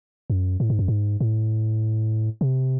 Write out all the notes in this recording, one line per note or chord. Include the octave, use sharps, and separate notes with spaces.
F#2
A2
G#2
F#2
G#2
A2
C3